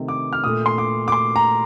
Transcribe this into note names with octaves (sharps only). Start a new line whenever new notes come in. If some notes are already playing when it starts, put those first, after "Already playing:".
Already playing: C3 D#3 A3
D6
F6
A#2 A3 D#6
C6
D6
D6
C6
A#5